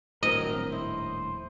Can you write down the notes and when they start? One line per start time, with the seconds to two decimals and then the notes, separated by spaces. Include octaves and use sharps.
0.23 D#1 A#1 A2 F#3 C4 A#4 C#5 D#5
0.72 E4 C5